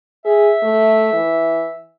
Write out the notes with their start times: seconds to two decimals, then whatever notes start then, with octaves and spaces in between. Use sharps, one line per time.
0.25 G#4 E5
0.62 A3
1.13 E3